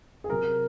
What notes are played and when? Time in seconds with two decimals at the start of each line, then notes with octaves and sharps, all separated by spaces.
0.24 G#4
0.29 C3 F#3 A#4